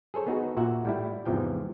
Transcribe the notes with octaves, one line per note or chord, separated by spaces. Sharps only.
G#4 A4 C5 C#5
B3 D#4 F#4 G#4
A#2 F#4 E5 F#5
A2 G3 E4
E2 G#2 C3 E3 F3 G5